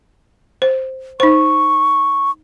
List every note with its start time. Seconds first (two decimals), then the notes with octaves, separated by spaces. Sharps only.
0.62 C5
1.20 D#4 C5 C#6